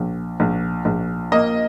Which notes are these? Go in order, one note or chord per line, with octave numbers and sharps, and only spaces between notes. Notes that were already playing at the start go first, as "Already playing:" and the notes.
Already playing: A#1
A#1
A#1
A#3 D#5